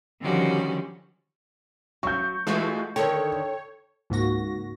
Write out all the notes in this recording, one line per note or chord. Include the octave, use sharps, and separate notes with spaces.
D3 D#3 F3 G3 C#4 F#4
F#3 C#6 G6
E3 G#3 A3 F4 F#4
D3 D#3 A4 C#5 G5
C#2 G#2 A#3 F#4 A#6